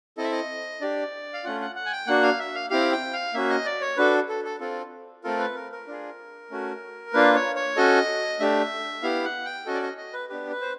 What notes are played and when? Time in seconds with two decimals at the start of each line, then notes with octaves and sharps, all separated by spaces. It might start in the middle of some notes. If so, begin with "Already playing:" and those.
0.17 C4 E4 A4 D#5
0.24 E5
0.32 D#5
0.81 D4 G4 D5
1.33 F5
1.44 A3 C#4 F4 F#5
1.61 F#5
1.76 F#5
1.86 G#5
1.92 G5
2.07 A#3 D4 F#4 F#5
2.23 F5
2.39 E5
2.55 F5
2.70 C4 E4 G4 F5
2.92 G5
3.13 F5
3.34 A#3 C#4 F#4 E5
3.50 D#5
3.65 D5
3.81 C#5
3.97 D4 F#4 A4 B4
4.29 A4
4.45 A4
4.60 C4 F4 A4
5.24 A3 C4 F4 A4 A#4
5.39 B4
5.55 A#4
5.72 A#4
5.87 D4 F4 G#4
6.51 A3 C#4 F#4
7.13 A#3 D4 F4 B4
7.35 C#5
7.56 C#5
7.77 C#4 F#4 A4 D#5
8.40 A3 D4 G4 E5
9.03 B3 E4 G4 F5
9.24 F#5
9.45 G5
9.66 C#4 F#4 A4 D#5
9.75 D5
9.82 D#5
9.98 D#5
10.13 B4
10.29 B3 D4 G4 B4
10.51 B4
10.61 C5